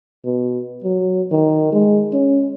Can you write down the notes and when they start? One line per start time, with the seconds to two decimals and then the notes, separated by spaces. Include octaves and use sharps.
0.25 B2
0.84 F#3
1.32 D#3
1.72 G#3
2.13 C#4